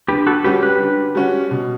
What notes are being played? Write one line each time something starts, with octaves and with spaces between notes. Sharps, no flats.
D3 G4 B4
F#4 A4
G3 C#4 F#4 G4 B4
G4 B4
D3
G3 C#4 F#4
B2